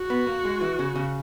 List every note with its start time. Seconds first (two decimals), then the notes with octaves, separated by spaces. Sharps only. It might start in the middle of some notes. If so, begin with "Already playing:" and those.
Already playing: F#4
0.10 B3
0.27 A#3
0.45 G#3
0.61 E3
0.79 C#3
0.96 C#3